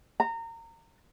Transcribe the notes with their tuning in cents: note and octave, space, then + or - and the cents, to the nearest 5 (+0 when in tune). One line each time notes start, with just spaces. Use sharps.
A#5 -25